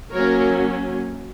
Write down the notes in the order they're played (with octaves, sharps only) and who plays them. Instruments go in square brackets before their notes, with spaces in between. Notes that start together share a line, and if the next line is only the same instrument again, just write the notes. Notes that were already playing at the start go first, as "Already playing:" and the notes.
[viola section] F#3 A#3 C#4 A#4 C#5